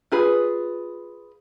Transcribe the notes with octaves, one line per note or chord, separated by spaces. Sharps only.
F4 G#4 B4